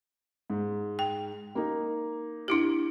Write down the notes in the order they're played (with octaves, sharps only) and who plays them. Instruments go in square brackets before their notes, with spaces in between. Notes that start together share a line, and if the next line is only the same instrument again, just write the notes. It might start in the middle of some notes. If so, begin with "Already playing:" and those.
[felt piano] G#2
[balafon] G5
[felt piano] A#3 D#4
[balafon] D4 E4 G4